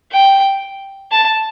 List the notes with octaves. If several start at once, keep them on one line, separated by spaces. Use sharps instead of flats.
G5
A5